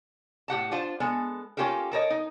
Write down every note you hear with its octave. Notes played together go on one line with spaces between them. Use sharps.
A2 G4 F#5 A5
D4 F4 C5
G#3 B3 A4
A#3 C#4 F4 G4 A4 A#4
A4 A#4 C#5 D#5
D#4